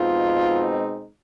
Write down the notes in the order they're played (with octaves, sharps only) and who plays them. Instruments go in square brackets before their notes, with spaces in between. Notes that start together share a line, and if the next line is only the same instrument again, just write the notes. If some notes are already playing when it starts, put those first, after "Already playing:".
Already playing: [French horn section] B2 G#3 C4 D#4 F4